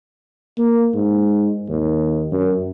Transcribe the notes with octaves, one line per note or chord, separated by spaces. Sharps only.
A#3
G#2
D#2
F#2